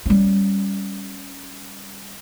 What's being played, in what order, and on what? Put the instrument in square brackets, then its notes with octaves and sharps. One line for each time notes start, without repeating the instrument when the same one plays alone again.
[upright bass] G3 C#4